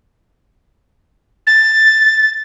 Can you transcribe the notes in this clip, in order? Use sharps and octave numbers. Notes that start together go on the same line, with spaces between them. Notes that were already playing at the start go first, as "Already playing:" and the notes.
A6